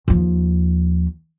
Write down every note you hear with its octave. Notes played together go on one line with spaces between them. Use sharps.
D#2 F3